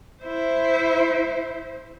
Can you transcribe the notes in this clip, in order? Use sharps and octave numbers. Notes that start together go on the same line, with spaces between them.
E4 C5